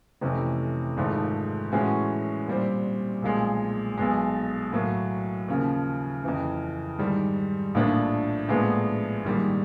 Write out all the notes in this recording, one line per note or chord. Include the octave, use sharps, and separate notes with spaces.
F2 C3 E3 A3 C#4
G#1 G#2 F3 A3
A2 E3 G#3 C#4 F#4
A#2 G3 C4
B1 A#2 F3 G#3
B1 B2 G#3
A2 F#3 A#3
D#2 C#3 F3
F2 C#3 E3
G#2 D#3 G3
A#1 A2 F3 A#3 D4
A#1 A2 F3 G#3 B3
A#1 G#2 D#3 G3